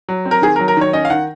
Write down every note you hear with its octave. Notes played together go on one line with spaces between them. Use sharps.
F#3
C4
A#4
D#3 G#4
A#4
F#3
A#4
D#3 C#5
C#4 D#5
F5
D#3 F#5